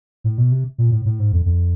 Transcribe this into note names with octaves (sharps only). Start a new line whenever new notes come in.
A2
B2
C3
A#2
A2
A2
G#2
F2
F2